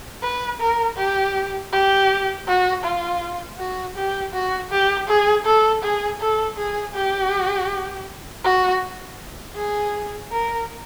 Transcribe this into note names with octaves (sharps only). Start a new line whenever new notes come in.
B4
A#4
G4
G4
F#4
F4
F#4
G4
F#4
G4
G#4
A4
G#4
A4
G#4
G4
F#4
G#4
A#4